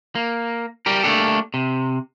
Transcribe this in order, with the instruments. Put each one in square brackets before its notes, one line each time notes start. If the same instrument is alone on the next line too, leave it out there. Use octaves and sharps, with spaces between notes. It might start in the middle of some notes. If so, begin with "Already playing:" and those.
[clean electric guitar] A#3
G3 G4 A#4
A3 A#3 C#4 D4 G4 A4
C3